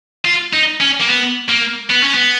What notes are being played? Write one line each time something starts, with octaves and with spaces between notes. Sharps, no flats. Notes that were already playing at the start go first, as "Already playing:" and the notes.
F4
D#4
C#4
A#3
B3
A#3
B3
C#4
B3